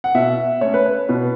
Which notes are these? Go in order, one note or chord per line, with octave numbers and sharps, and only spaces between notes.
F#5
B2 E5
A3 C#4 C#5
B4
C#5
B2 B4